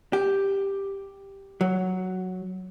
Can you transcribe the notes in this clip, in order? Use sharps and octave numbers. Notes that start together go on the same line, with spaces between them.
G4
F#3